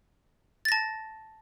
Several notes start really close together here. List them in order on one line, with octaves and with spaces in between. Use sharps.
A6 A#6 A5